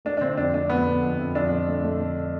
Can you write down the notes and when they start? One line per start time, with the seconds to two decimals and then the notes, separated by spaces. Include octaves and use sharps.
0.05 A3 D4
0.17 D4
0.21 D3 C4
0.38 F2 D4
0.54 A3 D4
0.70 F2 B3
0.86 D3
1.02 F2
1.19 F2
1.35 F2 D4
1.51 D3
1.67 A3
1.84 A3
1.99 D3